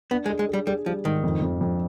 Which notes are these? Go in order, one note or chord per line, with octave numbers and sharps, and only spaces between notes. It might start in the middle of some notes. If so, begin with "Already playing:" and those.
B3 D4
G#3
G#4
G#3
G3 G#4
G3 G#4
F3 G3
G#2 D#3
F2
F2
F2